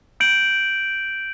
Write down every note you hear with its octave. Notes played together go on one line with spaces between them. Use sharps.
G6 D7 F#7